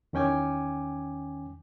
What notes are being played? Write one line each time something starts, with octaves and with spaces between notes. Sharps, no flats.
E2 D#3 C#4 G5 G#5 D6